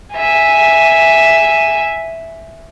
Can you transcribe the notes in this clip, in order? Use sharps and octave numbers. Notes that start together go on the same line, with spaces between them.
E5 G#5